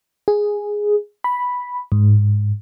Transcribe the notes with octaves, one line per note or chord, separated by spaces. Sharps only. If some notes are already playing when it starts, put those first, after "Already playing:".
G#4
B5
G#2